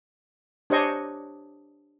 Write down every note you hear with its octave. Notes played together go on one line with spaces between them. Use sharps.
D4 G4 C5 C#5 D#5 C#6